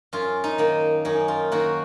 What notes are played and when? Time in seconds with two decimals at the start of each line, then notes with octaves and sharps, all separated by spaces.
0.13 F#2 F4
0.44 D#4
0.58 D#3 A#3
1.05 F#2 D#4
1.28 F4
1.52 D#3 A#3 F#4